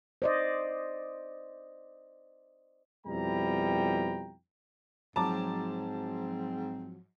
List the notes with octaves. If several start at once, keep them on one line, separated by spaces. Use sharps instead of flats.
C5 D5 D#5
F2 B2 G3 E4 G5 A#5
G#2 F3 F#3 C4 A5 A#5 D6